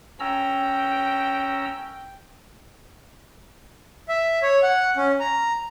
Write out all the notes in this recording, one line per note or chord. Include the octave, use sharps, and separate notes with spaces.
C#4 G5 A#5 E6
E5
C#5
F#5
C#4
A#5